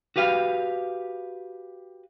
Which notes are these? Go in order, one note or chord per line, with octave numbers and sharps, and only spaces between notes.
F#4 G4 B4 F5